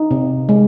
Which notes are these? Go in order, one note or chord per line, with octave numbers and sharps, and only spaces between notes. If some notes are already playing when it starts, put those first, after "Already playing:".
Already playing: D#4
C3
G#3